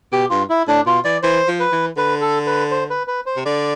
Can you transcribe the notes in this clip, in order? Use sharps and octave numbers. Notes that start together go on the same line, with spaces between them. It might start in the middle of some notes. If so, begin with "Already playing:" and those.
B2 G4
G2 F4
E4
A2 D4
B2 F4
E3 D5
E3 C5
F3
B4
E3
D3 B4
A4
B4
C5
B4
B4
C5
C3
D3 D5